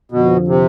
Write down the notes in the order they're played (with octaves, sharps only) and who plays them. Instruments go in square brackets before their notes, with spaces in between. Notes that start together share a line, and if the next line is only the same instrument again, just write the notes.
[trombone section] F2 D3 F3 [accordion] B2
[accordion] C3